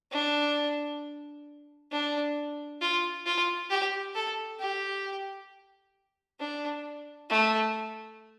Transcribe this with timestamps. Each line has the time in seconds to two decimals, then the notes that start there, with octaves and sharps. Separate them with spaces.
0.12 D4
1.92 D4
2.81 F4
3.26 F4
3.70 G4
4.15 A4
4.60 G4
6.39 D4
7.30 A3